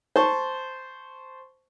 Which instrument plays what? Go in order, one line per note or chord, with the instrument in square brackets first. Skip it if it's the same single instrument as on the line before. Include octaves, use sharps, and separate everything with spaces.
[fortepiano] C5 A5 C#6